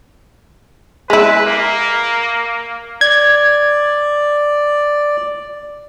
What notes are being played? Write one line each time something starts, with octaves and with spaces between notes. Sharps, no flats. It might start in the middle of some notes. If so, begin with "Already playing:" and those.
G#3 E4 B4
A#3
D5 G#6